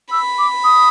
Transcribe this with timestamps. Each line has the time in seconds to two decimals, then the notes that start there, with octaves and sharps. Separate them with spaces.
0.12 B5 E6
0.39 D6
0.64 D#6